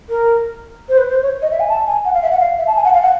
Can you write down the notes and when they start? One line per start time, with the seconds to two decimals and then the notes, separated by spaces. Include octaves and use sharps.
0.09 A#4
0.89 C5
0.98 B4
1.10 C5
1.22 C#5
1.42 D#5
1.51 E5
1.60 G#5
1.69 A5
1.87 G#5
2.05 F#5
2.14 F5
2.22 E5
2.31 F#5
2.40 F5
2.58 E5
2.67 A5
2.76 G#5
2.84 F#5
2.94 F5
3.02 F#5